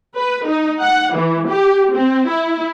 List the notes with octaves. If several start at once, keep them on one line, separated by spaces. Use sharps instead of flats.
B4
D#4
F#5
E3
G4
C4
E4